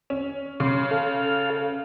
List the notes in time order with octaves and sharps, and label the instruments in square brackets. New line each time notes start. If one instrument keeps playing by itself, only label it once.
[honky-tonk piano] C#4
[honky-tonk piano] C#3 [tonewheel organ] C6
[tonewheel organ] A4 F5